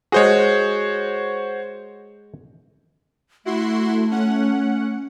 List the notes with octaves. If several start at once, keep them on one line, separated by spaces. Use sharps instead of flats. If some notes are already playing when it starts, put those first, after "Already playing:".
G#3 F#4 G#4 C5 C#5
A3 E4 F#4 C6
C#4 F#5